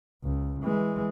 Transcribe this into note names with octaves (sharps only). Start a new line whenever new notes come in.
C#2
E3 G#3